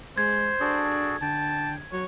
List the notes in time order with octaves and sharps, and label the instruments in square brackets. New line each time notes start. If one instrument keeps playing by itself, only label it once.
[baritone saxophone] G#3 [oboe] C5 [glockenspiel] G#6
[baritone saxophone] D4 [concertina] F#4 G#4 A4
[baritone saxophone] D3 [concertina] G5 [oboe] A5
[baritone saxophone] F#3 [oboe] C#5